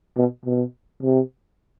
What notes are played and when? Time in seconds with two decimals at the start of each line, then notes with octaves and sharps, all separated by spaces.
0.17 B2
0.45 B2
1.02 C3